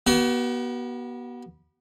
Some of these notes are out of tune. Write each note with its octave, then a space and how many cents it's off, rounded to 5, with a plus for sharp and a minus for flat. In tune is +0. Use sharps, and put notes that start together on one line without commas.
B3 -30 F#4 +45